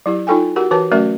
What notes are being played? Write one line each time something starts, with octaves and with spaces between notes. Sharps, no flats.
F#3 E4 G4
D#4 F4 A4 G5 G#5
F#4 G4 A#4 F#5
E3 F#4 A#4 B4 A5
F#3 A3 C#4 F#4 A#4 E5